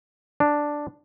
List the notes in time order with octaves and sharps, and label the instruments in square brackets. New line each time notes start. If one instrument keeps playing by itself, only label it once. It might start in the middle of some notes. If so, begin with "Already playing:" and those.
[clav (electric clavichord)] D4